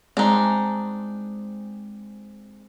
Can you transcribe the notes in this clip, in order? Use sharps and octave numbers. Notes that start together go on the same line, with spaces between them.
G#3 C4 D4 D#4